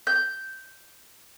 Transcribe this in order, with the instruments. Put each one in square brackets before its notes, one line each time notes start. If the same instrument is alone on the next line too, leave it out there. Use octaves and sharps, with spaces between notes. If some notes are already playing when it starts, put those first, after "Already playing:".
[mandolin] G6